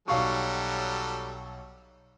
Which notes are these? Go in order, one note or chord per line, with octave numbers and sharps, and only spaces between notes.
B1 F#3 G3 A4 F5 C#6